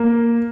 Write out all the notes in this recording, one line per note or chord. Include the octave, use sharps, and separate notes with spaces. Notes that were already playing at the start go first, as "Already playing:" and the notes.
Already playing: A#3